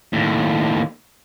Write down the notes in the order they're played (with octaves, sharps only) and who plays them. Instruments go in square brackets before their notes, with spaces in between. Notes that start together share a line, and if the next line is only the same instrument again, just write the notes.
[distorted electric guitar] D#2 A2